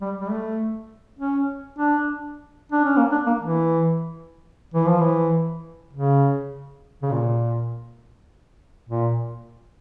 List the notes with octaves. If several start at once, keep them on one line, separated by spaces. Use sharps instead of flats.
G3
G3
A3
C#4
D4
D4
C#4
A#3
D4
A#3
E3
E3
F3
E3
C#3
C#3
A#2
A#2